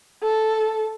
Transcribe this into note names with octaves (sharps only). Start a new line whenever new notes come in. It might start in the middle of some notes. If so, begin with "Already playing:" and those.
A4